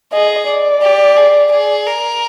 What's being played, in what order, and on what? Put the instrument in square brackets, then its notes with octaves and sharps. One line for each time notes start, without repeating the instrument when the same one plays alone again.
[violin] G#4 [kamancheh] D#5
[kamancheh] D5
[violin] G4
G#4
G#4
A#4